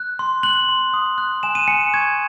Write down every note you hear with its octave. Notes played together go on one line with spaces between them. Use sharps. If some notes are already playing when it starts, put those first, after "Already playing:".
Already playing: F#6
C6
F#6 F#7
C6
D#6
F#6
G#5 E7
D#7
G#5 C#7
C#6 G#6